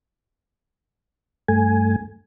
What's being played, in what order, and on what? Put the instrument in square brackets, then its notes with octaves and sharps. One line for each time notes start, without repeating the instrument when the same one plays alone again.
[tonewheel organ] G2 A3 G#5